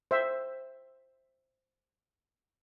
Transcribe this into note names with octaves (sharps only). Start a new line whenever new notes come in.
C5 E5